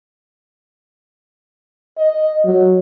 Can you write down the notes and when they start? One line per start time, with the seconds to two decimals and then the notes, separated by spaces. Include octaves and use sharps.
1.98 D#5
2.45 F#3